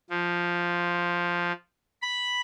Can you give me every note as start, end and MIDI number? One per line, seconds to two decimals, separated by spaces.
0.10 1.53 53
2.02 2.41 83